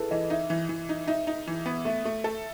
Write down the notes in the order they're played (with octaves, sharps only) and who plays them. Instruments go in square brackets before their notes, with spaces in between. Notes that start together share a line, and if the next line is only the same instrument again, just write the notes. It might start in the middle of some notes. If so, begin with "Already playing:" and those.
Already playing: [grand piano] E4 G#4 A4 B4
[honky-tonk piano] E3 [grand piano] D#5
[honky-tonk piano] D#4 [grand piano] E5
[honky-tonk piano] E3
E3
D#4
[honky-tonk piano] D#4 [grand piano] E5
[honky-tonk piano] D#4
E3
B3
[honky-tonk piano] A3 [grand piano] E5
[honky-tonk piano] A3
A4